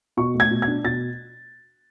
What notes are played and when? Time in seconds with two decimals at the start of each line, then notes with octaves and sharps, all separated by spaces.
0.17 B2 C#6
0.34 A3
0.40 G#6
0.51 B2
0.62 G#6
0.68 D4
0.84 B2 A6